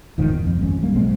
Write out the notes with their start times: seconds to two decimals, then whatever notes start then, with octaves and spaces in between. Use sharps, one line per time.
0.18 E1 G#2 D#3 F3
0.32 E2
0.46 F2
0.59 G#1 F2 C#4
0.83 G3 A#3
0.96 B1 G#3 C4